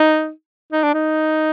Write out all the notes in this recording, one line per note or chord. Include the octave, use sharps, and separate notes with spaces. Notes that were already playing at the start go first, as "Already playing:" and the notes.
Already playing: D#4
D#4
D4
D#4